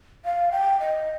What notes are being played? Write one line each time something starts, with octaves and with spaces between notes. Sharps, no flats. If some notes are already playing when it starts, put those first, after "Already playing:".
F5
G5
D#5